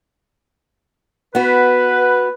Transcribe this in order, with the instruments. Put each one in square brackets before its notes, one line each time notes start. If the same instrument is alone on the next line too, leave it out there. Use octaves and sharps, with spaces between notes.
[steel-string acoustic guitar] B3 F#4 [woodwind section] B4